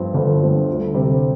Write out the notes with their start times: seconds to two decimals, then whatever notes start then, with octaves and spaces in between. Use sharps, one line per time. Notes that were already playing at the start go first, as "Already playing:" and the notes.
Already playing: G1 G2 F3 C4
0.14 G1 D3
0.41 G2 F3 C4
0.68 D2
0.94 C3 G3 C4